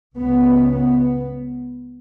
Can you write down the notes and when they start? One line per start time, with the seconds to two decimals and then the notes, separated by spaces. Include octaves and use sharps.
0.16 C#2 C#3 B3
0.74 B3